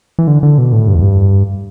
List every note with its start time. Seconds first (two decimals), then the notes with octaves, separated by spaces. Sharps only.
0.19 E3
0.27 D3
0.43 D3
0.58 B2
0.73 A2
0.88 G2
0.95 E2
1.02 G2